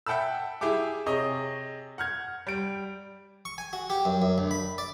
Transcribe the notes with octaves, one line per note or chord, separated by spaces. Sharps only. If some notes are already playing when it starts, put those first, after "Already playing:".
E5 F#5 G5 A5 B5 E6
E4 G4 G#4 E5 G5 D6
C3 G#4 C#5 D#5
F#5 F6 G#6
G3 D7
C#6
G#5
F#4
G4
F#2
F#2
D2
B5
D5